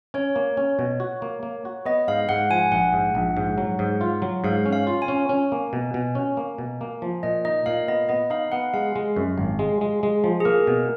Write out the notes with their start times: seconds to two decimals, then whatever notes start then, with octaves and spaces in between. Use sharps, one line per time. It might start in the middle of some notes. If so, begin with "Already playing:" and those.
0.14 C#4 C#5
0.36 A#3
0.57 C#4
0.79 B2
1.00 F#4
1.22 A#3
1.43 A#3
1.65 F#4
1.85 B3 D#5
2.08 G#2 F5
2.29 G#2 F#5
2.50 F3 G#5
2.72 A#1 F#5
2.93 G#2
3.15 A#1
3.37 G#2
3.58 F#3
3.79 G#2
4.01 F4
4.22 F#3
4.44 G#2 F5
4.66 C#4
4.73 F5
4.87 F4
5.02 G#5
5.08 C#4
5.29 C#4
5.52 A#3
5.73 B2
5.94 B2
6.15 C#4
6.37 A#3
6.58 B2
6.81 A#3
7.02 F3
7.23 A#2 D#5
7.45 D#4 D#5
7.66 A#2 F5
7.88 B3 D#5
8.09 B3 D#5
8.30 D#4 F5
8.52 B3 F#5
8.74 G#3 F5
8.96 G#3
9.16 F#2
9.38 G#1
9.59 G#3
9.81 G#3
10.03 G#3
10.24 F3
10.40 G#4
10.45 A#3 A#4
10.67 B2